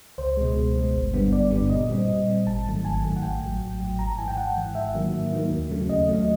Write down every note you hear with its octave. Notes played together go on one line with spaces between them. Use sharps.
C#2 C5
B2 G#3
C#2
B2 G#3
G1
G2 D3 G3 B3
G1 D5
G2 D3 G3 B3
A#2 D#5
G3 C4
A#2
G3 C4
G#1 A5
G#2 D#3 F#3 A3
G#1 G#5
G#2 D#3 F#3 A3
F#5
A1 G5
A2 F#3
A1
A2 F#3
G#1 A#5
A5
G#2 E3 G#5
G5
G#1 F#5
G#2 E3
G#2 E5
D#3 F#3 A#3
G#2
D#3 F#3 A#3
D#2
C#3 F#3 A3
D#2 D#5
C#3 F#3 A3